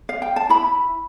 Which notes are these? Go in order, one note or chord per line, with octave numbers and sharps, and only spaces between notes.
F5
G5
A5
E4 B5